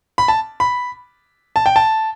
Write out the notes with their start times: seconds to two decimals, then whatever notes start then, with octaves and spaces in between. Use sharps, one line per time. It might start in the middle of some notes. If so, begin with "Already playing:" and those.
0.18 B5
0.28 A5
0.60 B5
1.56 A5
1.66 G5
1.76 A5